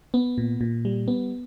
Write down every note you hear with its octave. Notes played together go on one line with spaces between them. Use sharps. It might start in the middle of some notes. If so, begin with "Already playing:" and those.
B3
A#2
A#2
G3
B3